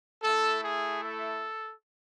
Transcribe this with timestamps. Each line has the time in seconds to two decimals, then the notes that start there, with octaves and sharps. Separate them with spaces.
0.22 A3 E4 A4
0.62 G#4
1.01 A4